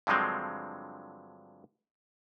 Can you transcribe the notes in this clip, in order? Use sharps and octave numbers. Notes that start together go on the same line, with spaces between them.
G2 D3 F3 F#3 G#3 C4